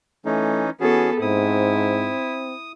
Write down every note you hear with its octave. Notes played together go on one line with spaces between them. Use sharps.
E3 A3 C#4 D#4
E3 B3 C#4 F#4 G#4 A4
G#2 C4 E4 D#6